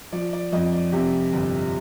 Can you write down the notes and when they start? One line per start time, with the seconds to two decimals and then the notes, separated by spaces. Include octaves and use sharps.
0.12 F3 D5
0.33 D5
0.52 F2 D#5
0.72 D5
0.92 C3 G4
1.33 G1